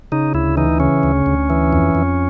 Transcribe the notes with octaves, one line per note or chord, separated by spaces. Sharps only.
C#3 D#4
D2 E4
E3 D#4
C#3 C#4
D2
D2
E3
F2
F2